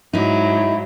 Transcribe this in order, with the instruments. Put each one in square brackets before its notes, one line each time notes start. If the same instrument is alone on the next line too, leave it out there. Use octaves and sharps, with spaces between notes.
[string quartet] G#2 F#3 [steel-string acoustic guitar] D#4 E4